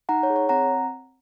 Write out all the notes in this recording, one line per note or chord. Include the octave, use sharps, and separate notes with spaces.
D#4 F#5 A#5
C#5
G#4
C#5
C4 F#5 A#5